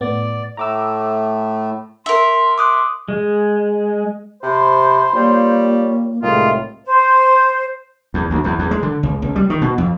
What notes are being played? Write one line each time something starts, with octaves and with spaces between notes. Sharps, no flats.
A2 B3 D5
A2 A3 A#5 D6 E6
A#4 E5 C6
C6 D6 D#6 F#6
G#3
C3 C5 B5
G3 A#3 F4 C#5
C2 A2 D#3 G#3 F4
C5
E2
D2
E2
E2
G#3
D3
C#2
C#2
G3
D#3
B2
F2